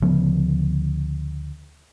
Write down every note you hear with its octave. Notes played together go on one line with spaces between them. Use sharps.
D2 C#3 F3 B3